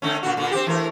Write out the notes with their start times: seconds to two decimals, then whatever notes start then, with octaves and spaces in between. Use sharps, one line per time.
0.02 D3 A3 C#4
0.23 A#2 D3 F#4
0.37 A#2 D3
0.51 C4 G4
0.67 E3 A3 A#4